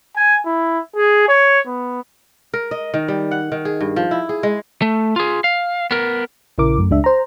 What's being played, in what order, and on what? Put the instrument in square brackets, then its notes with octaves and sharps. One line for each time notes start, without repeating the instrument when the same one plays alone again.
[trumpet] G#5
E4
G#4
C#5
B3
[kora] A#4
D#5
D#3
G3
F#5
D#3
G#4
G2
F3
E4
G#4
G#3
[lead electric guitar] A3
F4 G#4
F5
B3 A#4
[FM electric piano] A#1 C#3 E4 A#4 D6
F#2 A3
C#2 G#3 D4 E5
C5 A#5